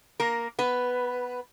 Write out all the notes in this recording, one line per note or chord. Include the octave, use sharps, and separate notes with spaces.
A#3 A#4
B3 B4